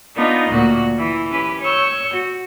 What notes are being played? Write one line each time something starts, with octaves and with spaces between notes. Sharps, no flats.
B3 D4 D#4 F4 D#5
D2 A#2 F#4
E3
C#4 G4 B4
C#5 C#6 E6 G6
F#4